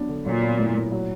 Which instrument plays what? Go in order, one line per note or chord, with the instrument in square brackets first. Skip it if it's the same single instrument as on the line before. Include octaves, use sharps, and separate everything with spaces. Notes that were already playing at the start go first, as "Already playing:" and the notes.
Already playing: [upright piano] F#3 B3 D4
D3
[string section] A#2 [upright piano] F#3
[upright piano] B3
A2
A2
F#3